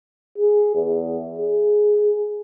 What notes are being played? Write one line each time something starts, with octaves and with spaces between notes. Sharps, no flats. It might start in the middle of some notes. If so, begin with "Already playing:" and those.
G#4
E2
G#4